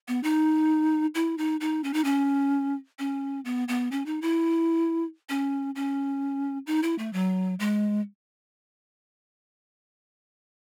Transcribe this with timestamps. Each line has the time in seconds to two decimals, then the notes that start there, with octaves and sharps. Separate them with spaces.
0.08 B3
0.23 D#4
1.15 E4
1.38 D#4
1.61 D#4
1.84 C#4
1.94 D#4
2.04 C#4
2.99 C#4
3.45 B3
3.68 B3
3.92 C#4
4.06 D#4
4.22 E4
5.29 C#4
5.75 C#4
6.67 D#4
6.83 E4
6.98 A3
7.13 F#3
7.60 G#3